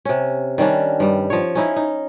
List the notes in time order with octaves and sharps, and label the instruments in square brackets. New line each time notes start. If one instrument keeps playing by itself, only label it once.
[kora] C3 C#4
D#3 G3 C#4 D4
G2 G3
F3 C#5
C#4 D#4 E4
D#4